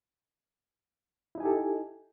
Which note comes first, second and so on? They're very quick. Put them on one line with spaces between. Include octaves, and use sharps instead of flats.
E4 D#4 G#5 G4 A4